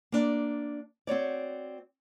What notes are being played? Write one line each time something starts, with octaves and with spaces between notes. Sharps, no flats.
A#3 D4
C4 F#4 C#5 D5